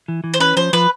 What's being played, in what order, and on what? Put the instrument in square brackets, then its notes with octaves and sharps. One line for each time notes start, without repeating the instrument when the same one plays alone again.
[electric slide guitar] E3
E3
[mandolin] C5
[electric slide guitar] C#4 [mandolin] B4
[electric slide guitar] F3 [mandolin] C5
[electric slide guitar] F3 [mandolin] B4